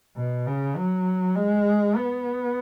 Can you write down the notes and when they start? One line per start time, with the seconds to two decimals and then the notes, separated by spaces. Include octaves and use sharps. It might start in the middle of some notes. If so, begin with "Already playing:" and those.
0.17 B2
0.47 C#3
0.77 F#3
1.36 G#3
1.96 B3